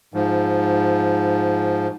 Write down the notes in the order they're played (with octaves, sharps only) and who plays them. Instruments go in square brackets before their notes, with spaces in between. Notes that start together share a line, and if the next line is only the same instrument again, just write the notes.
[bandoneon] G#2 F3